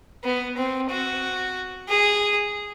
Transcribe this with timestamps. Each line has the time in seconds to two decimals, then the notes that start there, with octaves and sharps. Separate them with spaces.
0.24 B3
0.57 C4
0.90 F#4
1.89 G#4